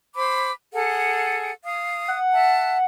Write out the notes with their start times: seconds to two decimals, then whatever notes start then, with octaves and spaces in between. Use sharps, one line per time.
0.16 C5 B5 D6
0.73 G#4 A4 F#5
1.63 F5 D#6
2.08 F#5
2.33 E5 A5